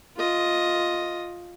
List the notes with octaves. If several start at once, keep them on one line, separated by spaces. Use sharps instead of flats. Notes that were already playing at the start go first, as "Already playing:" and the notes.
F4 D#5